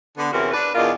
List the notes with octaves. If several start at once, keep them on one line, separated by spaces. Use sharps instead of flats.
D3 B3
E2 C3 E3 C#4 F#4 A#4
D4 B4
E2 B2 D4 F4 A#4 D#5